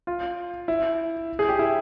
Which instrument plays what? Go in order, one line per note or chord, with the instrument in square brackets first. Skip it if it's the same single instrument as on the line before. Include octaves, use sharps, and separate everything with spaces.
[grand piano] F4
E4
G#4
G4
E4